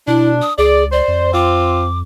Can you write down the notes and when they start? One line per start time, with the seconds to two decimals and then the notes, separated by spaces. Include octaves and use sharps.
0.07 B2 D4 E4
0.42 D#6
0.58 C#2 G#4 D5
0.92 C5 D5
1.08 F2
1.33 C4 F4 D6